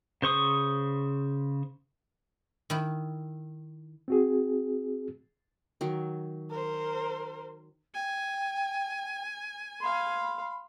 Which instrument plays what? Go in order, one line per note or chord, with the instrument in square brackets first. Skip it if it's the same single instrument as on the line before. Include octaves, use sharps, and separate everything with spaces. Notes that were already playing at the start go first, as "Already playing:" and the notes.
[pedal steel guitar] C#3 C5 C#6 D#6
[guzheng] D#3 E4
[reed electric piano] C4 F#4 G#4
[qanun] D#3 F#3
[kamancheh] A#4 C5
[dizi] G5 [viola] G#5
[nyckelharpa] F5 C6 [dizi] B5